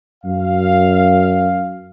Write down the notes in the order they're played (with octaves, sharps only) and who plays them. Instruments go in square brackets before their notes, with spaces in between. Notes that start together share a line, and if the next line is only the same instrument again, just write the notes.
[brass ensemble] F#2 F5